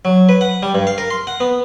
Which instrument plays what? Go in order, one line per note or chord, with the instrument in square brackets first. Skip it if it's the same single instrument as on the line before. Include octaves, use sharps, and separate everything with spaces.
[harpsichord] F#3
B4
F#5
G3
G2
F5
A#4
C6
F#5
B3